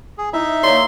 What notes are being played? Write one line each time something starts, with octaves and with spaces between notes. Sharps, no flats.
G#4
D#4 E4 E5
A#3 C#5 D5 C6